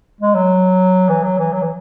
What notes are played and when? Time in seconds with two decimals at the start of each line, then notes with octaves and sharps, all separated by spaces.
0.21 G#3
0.35 F#3
1.09 E3
1.23 F#3
1.38 E3
1.53 F#3
1.62 E3